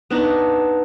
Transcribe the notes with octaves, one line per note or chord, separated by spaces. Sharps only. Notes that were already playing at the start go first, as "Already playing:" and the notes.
B3 D4 D#4